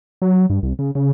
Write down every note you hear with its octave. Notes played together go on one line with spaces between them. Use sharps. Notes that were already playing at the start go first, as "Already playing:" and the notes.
F#3
G2
C2
C#3
C#3